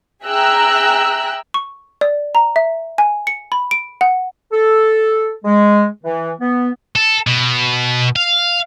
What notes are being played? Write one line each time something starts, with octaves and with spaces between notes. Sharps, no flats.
G#4 E5 G5 A#5 E6 F#6
C#6
D5
A#5
E5
G#5
C#7
B5
D7
F#5
A4
G#3
E3
B3
A4
B2
F5